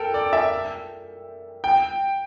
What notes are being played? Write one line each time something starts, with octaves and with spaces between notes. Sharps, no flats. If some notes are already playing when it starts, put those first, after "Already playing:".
Already playing: A4 A#4 G5
D5
E5
G5